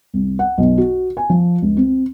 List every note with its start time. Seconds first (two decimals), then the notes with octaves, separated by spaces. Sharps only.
0.14 C2
0.39 F#5
0.58 B1
0.78 F#4
1.17 G#5
1.30 F3
1.62 C#2
1.77 C4